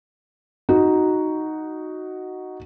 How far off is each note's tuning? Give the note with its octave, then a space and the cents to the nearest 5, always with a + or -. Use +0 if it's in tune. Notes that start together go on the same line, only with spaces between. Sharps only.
D#4 +0 F#4 +0